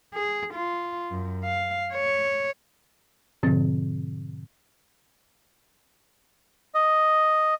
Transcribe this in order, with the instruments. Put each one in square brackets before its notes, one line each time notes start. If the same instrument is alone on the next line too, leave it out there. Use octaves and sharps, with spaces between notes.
[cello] G#4
F4
F#2
F5
C#5
[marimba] G#2 B2 D3 F3 C4 A6
[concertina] D#5